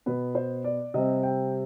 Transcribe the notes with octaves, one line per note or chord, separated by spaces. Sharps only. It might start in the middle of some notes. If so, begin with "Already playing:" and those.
B2 B3 B4
C5
D5
C3 G3 C4 D#5
G5